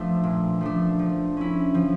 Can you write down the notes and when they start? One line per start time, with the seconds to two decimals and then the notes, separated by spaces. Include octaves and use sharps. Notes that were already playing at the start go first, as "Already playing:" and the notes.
Already playing: F3 A3 D4
0.24 A#2
0.61 F3 A3 D4
0.99 F3
1.37 C#4 E4
1.75 F3